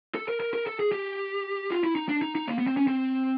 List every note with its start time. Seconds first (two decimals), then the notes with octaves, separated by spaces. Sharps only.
0.15 A4
0.28 A#4
0.40 A#4
0.54 A#4
0.67 A4
0.80 G#4
0.92 G4
1.71 F4
1.84 E4
1.96 D#4
2.09 D4
2.22 D#4
2.35 D#4
2.47 A#3
2.58 B3
2.67 C4
2.77 C#4
2.87 C4